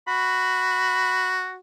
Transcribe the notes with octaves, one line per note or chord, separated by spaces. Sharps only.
F#4 B5